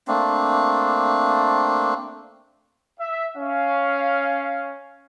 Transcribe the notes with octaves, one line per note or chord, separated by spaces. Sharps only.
A3 A#3 C4 D4
E5
C#4 F5